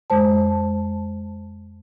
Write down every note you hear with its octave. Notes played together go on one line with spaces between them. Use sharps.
F2 G#3 C5 A5